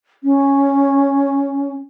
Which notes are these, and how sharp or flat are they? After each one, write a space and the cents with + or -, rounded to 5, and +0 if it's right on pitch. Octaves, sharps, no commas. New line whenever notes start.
C#4 +0